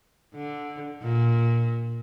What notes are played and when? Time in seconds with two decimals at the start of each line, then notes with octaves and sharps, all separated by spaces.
0.34 D3
1.01 A#2